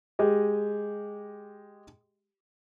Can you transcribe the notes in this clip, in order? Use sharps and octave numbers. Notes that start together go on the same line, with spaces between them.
G#3 G4 D#5